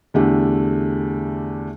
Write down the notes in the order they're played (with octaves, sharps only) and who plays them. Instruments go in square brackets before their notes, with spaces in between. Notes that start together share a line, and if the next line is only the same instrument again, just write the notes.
[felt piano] E2 D3 A3 D4 G4